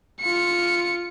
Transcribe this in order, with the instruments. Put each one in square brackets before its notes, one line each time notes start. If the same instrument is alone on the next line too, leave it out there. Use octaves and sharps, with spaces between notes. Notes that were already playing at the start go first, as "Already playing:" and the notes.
[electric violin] F4 C#7